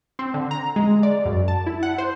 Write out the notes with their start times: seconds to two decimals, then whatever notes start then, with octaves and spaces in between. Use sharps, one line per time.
0.19 C4
0.34 D3
0.51 A#5
0.76 G#3
1.03 D5
1.25 F#2
1.48 A5
1.66 E4
1.83 F#5
1.98 C5